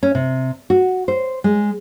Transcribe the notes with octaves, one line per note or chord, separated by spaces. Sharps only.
C#4
C3
F#4
C5
G#3